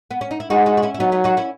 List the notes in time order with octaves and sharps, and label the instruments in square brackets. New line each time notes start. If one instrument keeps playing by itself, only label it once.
[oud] B3
C#4
D#4
E4
[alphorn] G#3 [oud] D#4 F#4
[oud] D#4 F#4
F#4
C#4 E4
E4
[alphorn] F#3 [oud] B3 D#4
[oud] B3 D#4
D#4 F#4
C#4 E4